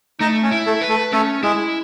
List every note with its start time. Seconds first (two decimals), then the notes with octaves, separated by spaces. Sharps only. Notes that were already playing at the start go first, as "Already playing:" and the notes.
0.20 A3 D#4 D#5
0.43 C#4 C#5
0.51 E4
0.67 A3 A4
0.82 B4
0.89 A3 A4
1.12 A3 C#4 A4
1.43 G#3 E4 G#4